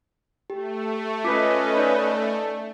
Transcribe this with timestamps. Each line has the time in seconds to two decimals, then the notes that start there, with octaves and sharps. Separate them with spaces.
0.50 A3 G4
1.24 C#4 F4 B4 D#5 D6 B6
1.77 D#4 D5 G6